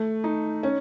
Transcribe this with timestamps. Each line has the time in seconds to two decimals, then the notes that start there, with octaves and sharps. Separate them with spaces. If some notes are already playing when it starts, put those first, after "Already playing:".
Already playing: A3
0.24 D#4
0.63 C#4